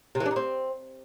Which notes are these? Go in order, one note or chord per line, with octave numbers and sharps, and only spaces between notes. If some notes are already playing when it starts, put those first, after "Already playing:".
C3
E3
D4
D#4
C4